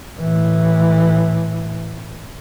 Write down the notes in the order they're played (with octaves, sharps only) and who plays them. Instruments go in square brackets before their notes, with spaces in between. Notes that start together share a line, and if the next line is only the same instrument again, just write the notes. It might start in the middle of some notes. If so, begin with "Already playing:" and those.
[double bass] A2 E3